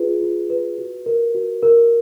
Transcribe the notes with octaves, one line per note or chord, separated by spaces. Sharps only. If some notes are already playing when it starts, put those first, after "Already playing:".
Already playing: F4 G#4 B4
F4
B4
F#4
A#4
F#4
A#4